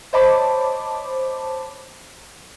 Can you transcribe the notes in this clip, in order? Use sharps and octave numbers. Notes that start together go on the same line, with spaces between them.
C5 C#5 D#5 A5 B5 D6